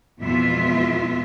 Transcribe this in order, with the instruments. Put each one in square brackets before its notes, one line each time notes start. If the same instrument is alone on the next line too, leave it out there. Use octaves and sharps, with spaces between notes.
[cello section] F2 B2 E3 G#3 F4 E5